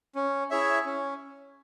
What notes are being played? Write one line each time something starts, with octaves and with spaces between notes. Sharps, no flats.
C#4
E4 G#4 C#5 E5
C#4